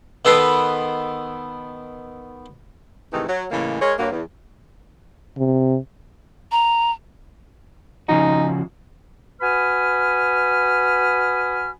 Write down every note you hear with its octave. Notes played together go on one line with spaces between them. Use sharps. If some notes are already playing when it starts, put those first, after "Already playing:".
D#3 B3 A4 B4 C6
G#2 C3 D#3 E3 A3 D#4
F#3
A2 C#3 E3 G#3 A#3
G#3 G#4 A#4 C#5
G2 F#3 A#3
E2
C3
A#5
C#3 F3 D#4 F#4
F#4 B4 G#5 B5 D#6 F6